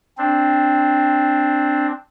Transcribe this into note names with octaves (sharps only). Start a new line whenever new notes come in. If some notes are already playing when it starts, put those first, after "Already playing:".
C4 D4